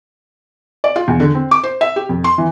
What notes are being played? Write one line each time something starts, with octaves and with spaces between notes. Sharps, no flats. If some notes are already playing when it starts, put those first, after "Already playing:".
D5
F4
E2
D3
C4
D6
C5
E5
G4
F2
C6
E3